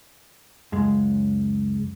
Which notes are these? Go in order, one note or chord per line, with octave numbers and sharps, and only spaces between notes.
C#2 F#2 G#3